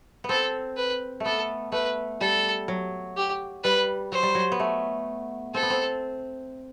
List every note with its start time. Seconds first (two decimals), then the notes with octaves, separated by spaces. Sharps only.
0.24 B3
0.29 C4 A4
0.76 B4
1.20 A3 B3 A4
1.72 A3 B4
2.21 G3 A4
2.68 F#3
3.16 G4
3.63 G3 B4
4.12 F#3 C5
4.23 G3
4.35 F#3
4.52 B3
4.60 A3
5.54 C4 A4
5.63 B3
5.70 C4